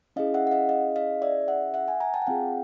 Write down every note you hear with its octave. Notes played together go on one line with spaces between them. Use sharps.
C#4 E4 G#4 D#5 F5
E5 F#5
F#5
D#5 F5
D#5 F5
D#5 F5
D5 E5
E5 F#5
E5 F#5
F#5 G#5
G#5 A#5
G5 A5
F#5
C4 F4 G#4 F5 G5